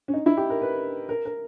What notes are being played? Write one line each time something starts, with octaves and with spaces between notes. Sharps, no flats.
C#4
D#4
E4
G4
A#4
B4
A#4
A#4